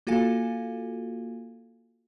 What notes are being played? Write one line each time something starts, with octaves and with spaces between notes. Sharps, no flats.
A#3 F4 F#4 A4 F5 G#5